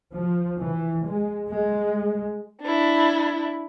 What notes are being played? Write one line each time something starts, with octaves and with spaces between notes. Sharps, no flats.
F3
E3
G#3
G#3
D4 E4